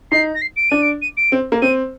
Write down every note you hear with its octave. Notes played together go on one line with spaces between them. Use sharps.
D#4 C7
A#6
C7
D7
D4 D#7
D7
D#7
D7
C4
A#3
C4 D#7